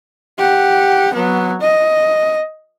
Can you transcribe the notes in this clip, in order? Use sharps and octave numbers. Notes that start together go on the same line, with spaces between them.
G4 F#5
F#3 B3
D#5